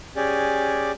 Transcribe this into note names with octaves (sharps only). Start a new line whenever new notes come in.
C#4 G4 G#4 D5